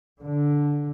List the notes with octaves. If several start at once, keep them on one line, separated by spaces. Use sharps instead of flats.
D3